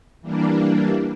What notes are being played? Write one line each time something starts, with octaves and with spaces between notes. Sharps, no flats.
E3 G3 A#3 D4